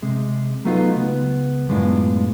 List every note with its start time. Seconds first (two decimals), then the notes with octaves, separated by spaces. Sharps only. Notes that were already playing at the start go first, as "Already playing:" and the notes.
0.02 C3 G#3
0.65 F#3 A3 B3 D#4 F4
0.96 C#2 B3
1.68 F#2 A2 G#3 B3 D4 F4